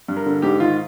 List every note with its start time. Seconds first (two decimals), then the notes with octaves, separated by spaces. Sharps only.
0.08 G2
0.17 A#4
0.26 D3
0.42 G#2 G4
0.60 D#3 F4